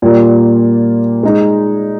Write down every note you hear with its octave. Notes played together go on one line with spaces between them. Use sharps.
A#2 G3 A#3 F4
G#3 D#4 G#4